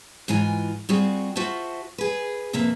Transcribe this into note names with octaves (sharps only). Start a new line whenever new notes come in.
G#2 E3 F4 G#5
G3 C4 F4 F#4 G#4
F4 F#4 C5 E5 A5
G#4 B4
F2 C3 A#3 B4 E5